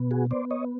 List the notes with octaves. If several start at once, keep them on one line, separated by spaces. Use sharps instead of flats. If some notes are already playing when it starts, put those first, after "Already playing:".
Already playing: B2 B3
F#4 G#4
B3 C5 D5
C#5 D#5